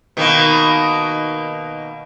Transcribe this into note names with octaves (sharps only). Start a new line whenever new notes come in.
B2 D#3 A#3